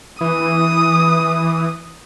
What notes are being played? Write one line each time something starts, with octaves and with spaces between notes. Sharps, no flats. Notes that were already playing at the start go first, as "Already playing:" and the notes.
E3 D#6